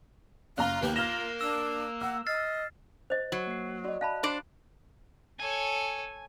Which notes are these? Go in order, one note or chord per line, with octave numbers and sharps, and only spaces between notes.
F#1 F4 F5 A#5 F#6 G7
D#2 A#3 G4 B4
F4 F6 A#6 E7 F7 G7
D4 E6 E7
F#5 E6
D#5 F6 A6 C7
C5 D#5
F#3
A#3 C7
F#4 D5 D#5
F5 A5 B5 F#6
D4 C5 D5
A4 C#5 G#5